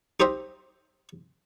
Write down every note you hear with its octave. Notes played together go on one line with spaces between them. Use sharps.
D#4 G4 C5 D#5 E5